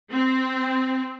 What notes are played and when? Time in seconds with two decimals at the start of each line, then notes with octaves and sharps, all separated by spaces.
0.11 C4